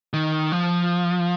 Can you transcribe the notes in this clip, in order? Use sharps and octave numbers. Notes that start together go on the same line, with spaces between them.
D#3
F3